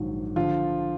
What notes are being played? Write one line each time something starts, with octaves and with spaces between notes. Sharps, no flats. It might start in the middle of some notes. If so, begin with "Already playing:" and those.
Already playing: A#1 G#2 D#3 F#3
D3 F3 F4